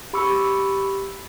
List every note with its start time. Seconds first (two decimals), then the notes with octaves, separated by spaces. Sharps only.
0.13 G4 B5 C#6 D6 E6 C#7